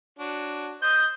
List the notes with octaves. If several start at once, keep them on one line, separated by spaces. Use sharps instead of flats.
D4 F#4 C#5
C5 D#5 D#6 G6